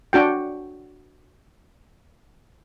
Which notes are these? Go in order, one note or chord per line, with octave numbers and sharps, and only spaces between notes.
D4 F#4 G5